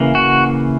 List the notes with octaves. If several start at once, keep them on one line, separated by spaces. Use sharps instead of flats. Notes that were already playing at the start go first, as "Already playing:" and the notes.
Already playing: C#3 E3 A#3
F#4